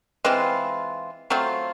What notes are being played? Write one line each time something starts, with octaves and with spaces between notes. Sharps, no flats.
E3 G#3 C4 F4
F#3 A3 C4 F4